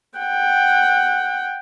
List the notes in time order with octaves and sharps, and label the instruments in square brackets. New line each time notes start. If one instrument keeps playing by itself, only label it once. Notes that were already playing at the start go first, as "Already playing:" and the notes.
[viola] F#5 G5